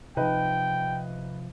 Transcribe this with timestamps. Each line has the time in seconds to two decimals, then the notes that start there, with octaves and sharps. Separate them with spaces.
0.17 C3 F3 D#4 B4 D#5 G5